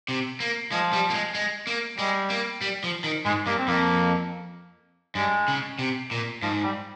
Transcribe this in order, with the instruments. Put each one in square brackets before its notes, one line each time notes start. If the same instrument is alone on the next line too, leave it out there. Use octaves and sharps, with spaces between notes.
[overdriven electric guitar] C3
A#3
[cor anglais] F3 [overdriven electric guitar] G#3
[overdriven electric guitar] G3
A#3
G#3
G#3
A#3
[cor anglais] G3 [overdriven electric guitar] G#3
[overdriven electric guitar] A#3
G3
F3
D#3
[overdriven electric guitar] G#2 [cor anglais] G#3
[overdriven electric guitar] G2 [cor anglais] A#3
[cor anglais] C4
[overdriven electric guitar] F2 [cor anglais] A#3
[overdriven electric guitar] G2 [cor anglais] G#3
[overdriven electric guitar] C#3
C3
A#2
[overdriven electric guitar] G#2 [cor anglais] F3
[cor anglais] G3